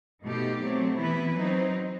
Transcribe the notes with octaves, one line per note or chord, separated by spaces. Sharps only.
B2 A3 D#4 G4
F#3 A3 C4
E3 B3 E4 B4
F#3 C4 D#4